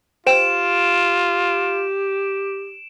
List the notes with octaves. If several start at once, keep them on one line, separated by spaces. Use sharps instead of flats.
F4 G4 C5 G5 D7 E7